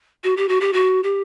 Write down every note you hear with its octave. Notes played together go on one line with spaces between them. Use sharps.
F#4
G4
F#4
G4
F#4
G4